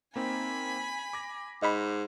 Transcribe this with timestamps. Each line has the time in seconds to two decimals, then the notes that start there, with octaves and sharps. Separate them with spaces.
0.16 A#3 C4 D#4 G#5 B5
1.13 D6 A#6
1.62 G#2 D#5 B5